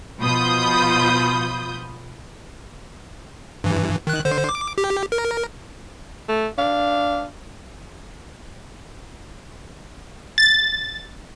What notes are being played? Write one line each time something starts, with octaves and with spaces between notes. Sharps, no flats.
B2 F3 F4 B5 D#6 G6
G2 E3
D#3 F#6
D3 C5
D6
G4
A#4
A3
D4 F5
A6